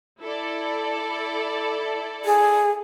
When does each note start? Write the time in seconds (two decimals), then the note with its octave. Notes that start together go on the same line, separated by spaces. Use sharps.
0.21 E4 A4 D5
2.25 G#4